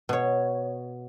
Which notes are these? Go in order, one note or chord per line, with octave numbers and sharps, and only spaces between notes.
B2 C#5